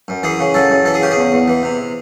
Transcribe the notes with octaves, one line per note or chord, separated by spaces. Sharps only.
F#2
E3 G#4
C#3
F#2 A4
F#2
E3 A4
G#4
C#3 G4
G#4
E2
E2
E3
C3